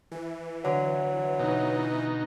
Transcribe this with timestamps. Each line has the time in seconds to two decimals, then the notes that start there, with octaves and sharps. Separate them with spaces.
0.11 E3
0.65 D3 F#3
1.40 B2 D#4